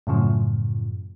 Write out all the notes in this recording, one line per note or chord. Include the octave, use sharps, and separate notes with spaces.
F#2 A2 C#3 F3